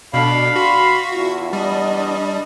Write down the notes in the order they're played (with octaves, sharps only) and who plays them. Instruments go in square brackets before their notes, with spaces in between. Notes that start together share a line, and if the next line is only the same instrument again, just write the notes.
[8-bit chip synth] B2 [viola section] D4 A4 [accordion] F5 B5
[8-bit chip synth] F#4 [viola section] C6
[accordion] E2 [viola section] E4 F4
[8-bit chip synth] G3 [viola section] D4 D#5